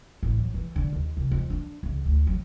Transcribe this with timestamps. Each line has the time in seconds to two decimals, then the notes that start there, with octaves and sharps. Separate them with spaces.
0.23 A1
0.38 F#3
0.54 E3
0.76 D3
0.93 D#2
1.17 C2
1.31 F2
1.50 D4
1.83 C#2
2.05 D2
2.27 F#3